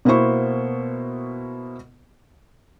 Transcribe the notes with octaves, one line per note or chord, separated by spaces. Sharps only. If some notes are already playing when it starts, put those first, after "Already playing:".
B2 A#3 B3 E4 C5 C#6